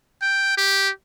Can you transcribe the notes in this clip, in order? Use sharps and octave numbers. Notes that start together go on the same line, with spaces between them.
G5
G4